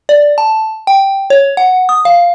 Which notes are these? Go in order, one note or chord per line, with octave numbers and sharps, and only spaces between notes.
D5
A5
G5
C#5
F#5
D#6
F5